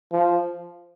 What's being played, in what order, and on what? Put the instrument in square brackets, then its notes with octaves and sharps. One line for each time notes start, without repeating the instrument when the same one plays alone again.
[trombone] F3